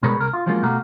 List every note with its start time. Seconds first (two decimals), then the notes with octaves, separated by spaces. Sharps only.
0.03 B2 G3 G#3 A#4 B4 C#5
0.17 C2 A#4
0.33 F4
0.46 F3 F#3 G#3 A#3 C#4 F4
0.63 B2 A3 F#4 G4 F5 A#5